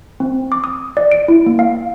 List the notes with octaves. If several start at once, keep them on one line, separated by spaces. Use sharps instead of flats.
C4
D6
D#6
D5
D7
E4
A#3
F5